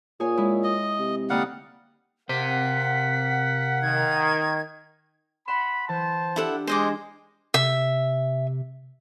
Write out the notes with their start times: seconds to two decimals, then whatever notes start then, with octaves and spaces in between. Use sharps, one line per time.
0.20 A#2 G#4 C#5 G#5
0.37 G#3 E4
0.64 D#5
0.99 C3
1.30 D3 G3 A#3 D#4 F5 F#5
2.29 C3 A#4 C5 F5 F#5 B6
3.82 D#3 G#6
5.48 F#5 B5 C6 E7
5.89 E3 C5 A5
6.36 D4 E4 G4 A4 F#5
6.67 G#3 C5 D#5 D6
7.54 C3 E5